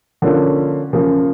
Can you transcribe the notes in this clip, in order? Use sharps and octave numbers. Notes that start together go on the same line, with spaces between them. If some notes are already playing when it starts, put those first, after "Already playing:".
D3 F3 A#3 C#4 F4
C#3 F3 A#3